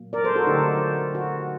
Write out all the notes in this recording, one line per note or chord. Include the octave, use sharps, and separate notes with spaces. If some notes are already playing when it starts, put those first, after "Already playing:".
Already playing: A#2 F#3 A#3
A#4 D5
A4 C5
F#4 A4
D3 F#3 A3 D#4 G4
F#4